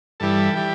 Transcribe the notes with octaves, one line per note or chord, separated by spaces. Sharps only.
G2 E3 G3 A4
E3 G3 G4